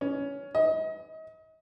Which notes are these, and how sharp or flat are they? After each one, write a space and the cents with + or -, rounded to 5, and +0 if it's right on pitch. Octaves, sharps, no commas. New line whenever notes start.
C#4 +15
D#5 +35